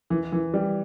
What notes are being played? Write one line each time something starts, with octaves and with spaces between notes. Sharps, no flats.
E3
E3
G3